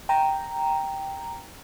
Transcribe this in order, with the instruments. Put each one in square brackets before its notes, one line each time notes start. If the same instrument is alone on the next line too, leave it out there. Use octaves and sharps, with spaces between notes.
[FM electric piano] G5 A#5